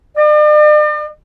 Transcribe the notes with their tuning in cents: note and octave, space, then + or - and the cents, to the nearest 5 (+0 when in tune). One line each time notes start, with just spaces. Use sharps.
D5 +45